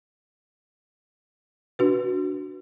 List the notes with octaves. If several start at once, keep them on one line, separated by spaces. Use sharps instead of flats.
D4 F#4 B4